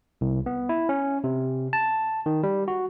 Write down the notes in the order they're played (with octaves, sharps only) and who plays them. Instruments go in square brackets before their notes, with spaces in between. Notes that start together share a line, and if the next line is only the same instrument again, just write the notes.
[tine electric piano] C2
B3
E4
C#4
C3
A5
D#3
G3
F#4